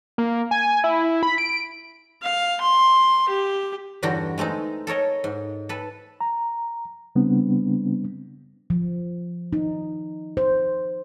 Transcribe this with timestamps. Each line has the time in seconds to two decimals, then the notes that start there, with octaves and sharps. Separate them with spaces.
0.18 A#3
0.51 G#5
0.84 E4
1.23 B5
1.38 D7
2.22 F5
2.61 C6
3.28 G4
4.03 E2 G2 D3 F#4 G5 A#5
4.38 G#3 A3 C4 D#4
4.87 A4 A#4 C#5 D#5
5.24 G#2
5.69 A4 B4
6.21 A#5
7.16 C#3 G3 B3 C4 D4
8.70 F3
9.53 D#4
10.37 C5